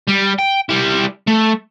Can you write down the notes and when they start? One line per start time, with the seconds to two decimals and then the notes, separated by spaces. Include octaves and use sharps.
0.07 G3
0.38 G5
0.69 G3 E4
1.28 A3